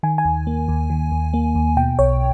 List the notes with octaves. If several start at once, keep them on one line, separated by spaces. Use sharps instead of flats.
D#3 G#5
G#5
D#2
A#3
D#2
D#3
D#2
A#3
D#2
B2 G5
B1 C#5